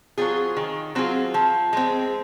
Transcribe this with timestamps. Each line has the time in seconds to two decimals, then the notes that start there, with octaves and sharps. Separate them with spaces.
0.18 F#3 C4 F4 G#4
0.57 D#3
0.95 F#3 C4 F4 G#4
1.34 F3
1.73 G#3 C4